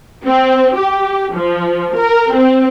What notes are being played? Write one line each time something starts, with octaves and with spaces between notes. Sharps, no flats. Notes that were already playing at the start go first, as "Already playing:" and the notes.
C4
G4
F3
A#4
C4